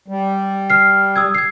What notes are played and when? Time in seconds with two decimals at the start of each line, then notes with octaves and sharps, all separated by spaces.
0.08 G3
0.70 F6 C7
1.16 D#6 E6 G#6
1.34 G#6 C7